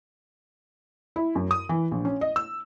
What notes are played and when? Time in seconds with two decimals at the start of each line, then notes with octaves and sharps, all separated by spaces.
1.16 E4
1.35 F#2
1.51 D#6
1.69 E3
1.91 A#1
2.05 C#4
2.21 D#5
2.36 E6